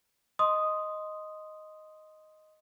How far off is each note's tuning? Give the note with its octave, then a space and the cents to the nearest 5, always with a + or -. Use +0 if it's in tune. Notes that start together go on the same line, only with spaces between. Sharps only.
D#5 +0 C6 +0 D#6 +0